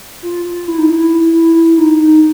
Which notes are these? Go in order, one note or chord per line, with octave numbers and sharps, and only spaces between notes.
F4
F4
E4
D#4
E4
E4
E4
E4
D#4
D#4